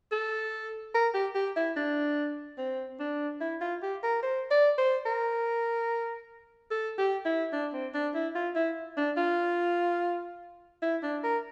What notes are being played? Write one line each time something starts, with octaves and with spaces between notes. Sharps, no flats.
A4
A#4
G4
G4
E4
D4
C4
D4
E4
F4
G4
A#4
C5
D5
C5
A#4
A4
G4
E4
D4
C4
D4
E4
F4
E4
D4
F4
E4
D4
A#4